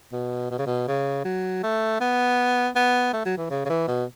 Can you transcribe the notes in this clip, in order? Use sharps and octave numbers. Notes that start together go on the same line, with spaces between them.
B2
B2
C#3
B2
C#3
F#3
A3
B3
B3
A3
F#3
E3
C#3
C#3
E3
B2